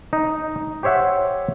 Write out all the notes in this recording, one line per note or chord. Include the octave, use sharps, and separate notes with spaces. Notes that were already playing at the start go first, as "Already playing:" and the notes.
D#4
G4 C5 C#5 E5 F#5